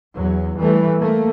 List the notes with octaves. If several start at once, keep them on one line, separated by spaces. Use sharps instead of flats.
E2 F#3
E3 G3 A3
A3 A#3